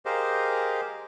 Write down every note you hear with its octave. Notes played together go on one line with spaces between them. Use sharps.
G4 G#4 A#4 C5 D#5 F5